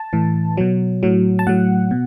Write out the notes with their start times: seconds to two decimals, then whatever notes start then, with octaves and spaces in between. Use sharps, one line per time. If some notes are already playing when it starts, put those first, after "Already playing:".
Already playing: A5
0.13 A2 E3
0.57 B2 F#3
1.03 A2 F#3
1.39 A5
1.47 A2 F#3 F#5
1.91 B2